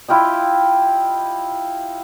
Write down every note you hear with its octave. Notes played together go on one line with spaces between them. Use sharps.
E4 F4 G4 D#5